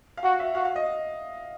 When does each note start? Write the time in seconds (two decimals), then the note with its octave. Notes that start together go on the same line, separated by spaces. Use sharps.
0.17 F5
0.24 F#4 F#5
0.40 E5
0.55 F#4 F5
0.65 F5
0.76 D#5